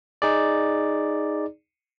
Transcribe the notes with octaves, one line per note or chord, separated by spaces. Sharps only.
D#4 G#4 D5